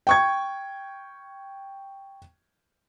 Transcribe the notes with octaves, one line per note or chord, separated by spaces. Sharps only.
G5 C#6 G#6